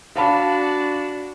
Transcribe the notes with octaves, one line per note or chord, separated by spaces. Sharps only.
D4 F#4 F5 A5 B5